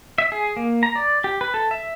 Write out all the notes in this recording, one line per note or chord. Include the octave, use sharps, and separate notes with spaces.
E5
G#4
A#3
A#5
D5
G4
B4
A4
E5